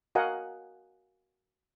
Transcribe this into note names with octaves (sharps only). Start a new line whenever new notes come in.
F#4 A#4 D#5 F5 F#5 G#5